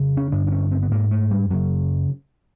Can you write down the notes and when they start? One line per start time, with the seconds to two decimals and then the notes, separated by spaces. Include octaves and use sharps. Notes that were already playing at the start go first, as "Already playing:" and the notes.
Already playing: F2 C#3
0.17 C#4
0.32 G2 D3 D4
0.47 D4
0.52 C#4
0.71 C4
0.82 B3
0.91 G#2 A#3
1.11 A3
1.31 G3
1.50 F#2 C#3 F#3